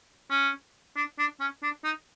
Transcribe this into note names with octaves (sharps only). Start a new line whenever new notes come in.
C#4
D4
D4
C#4
D4
D#4